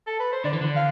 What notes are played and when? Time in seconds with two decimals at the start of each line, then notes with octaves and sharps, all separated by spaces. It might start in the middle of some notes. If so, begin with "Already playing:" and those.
0.07 A4
0.20 B4
0.32 C5
0.44 D3 D5
0.53 E3
0.61 D3
0.76 F5